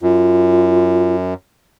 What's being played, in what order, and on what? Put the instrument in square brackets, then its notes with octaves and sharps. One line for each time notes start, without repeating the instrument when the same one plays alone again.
[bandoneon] F#2 [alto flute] F4